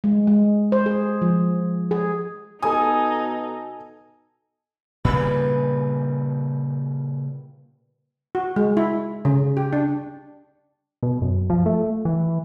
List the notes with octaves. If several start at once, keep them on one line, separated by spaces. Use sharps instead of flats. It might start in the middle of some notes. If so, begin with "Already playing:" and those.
G#3
G#3
C5
G#4
F3
G#4
B2 D#4 A4 G#5 D#6
A#2 C#3 G3 B4
F#4
G#3
E4
C#3
G4
D4
B2
F#2
F3
A3
E3